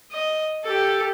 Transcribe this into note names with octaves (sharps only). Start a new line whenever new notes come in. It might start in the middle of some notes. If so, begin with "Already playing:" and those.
D#5
G4 A4